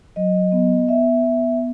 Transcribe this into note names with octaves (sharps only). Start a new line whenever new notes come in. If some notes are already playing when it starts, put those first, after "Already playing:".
F#3 D#5
B3
B3 E5
B3